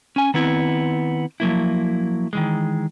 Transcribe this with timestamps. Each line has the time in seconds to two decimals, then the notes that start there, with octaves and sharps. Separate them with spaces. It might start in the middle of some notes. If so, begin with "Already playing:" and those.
0.16 C#4 G#5
0.34 D#3 B3 C4 E4
1.40 F3 F#3 A#3 E4
2.33 D#3 E3 G#3